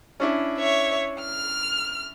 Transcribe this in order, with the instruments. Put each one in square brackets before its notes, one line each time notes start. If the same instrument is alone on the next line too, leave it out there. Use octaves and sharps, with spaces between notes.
[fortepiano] C#4 D4 E4
[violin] C#5 E5
F6